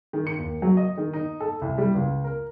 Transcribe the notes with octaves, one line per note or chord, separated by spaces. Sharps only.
D#3
C#7
D#2
F#3
D#5
D#3
D#4
A4
C2
G3
C#2
A#4